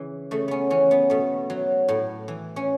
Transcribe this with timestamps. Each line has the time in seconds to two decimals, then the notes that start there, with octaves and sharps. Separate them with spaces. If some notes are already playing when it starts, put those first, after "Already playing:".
Already playing: C#3 E3
0.31 C#3 A3
0.48 B3 C#4
0.70 E3 C#4
0.91 B3
1.10 B2 A3
1.50 F#3
1.88 A2
2.28 E3
2.56 C#4